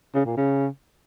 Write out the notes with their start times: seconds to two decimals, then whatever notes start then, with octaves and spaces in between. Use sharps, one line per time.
0.15 C#3
0.26 A#2
0.37 C#3